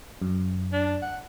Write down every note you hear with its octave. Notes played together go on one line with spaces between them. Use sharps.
F#2
D4
F#5